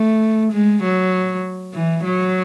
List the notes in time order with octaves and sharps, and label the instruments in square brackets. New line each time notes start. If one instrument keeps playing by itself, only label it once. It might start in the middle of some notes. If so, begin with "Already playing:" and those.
Already playing: [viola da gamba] A3
G#3
F#3
E3
F#3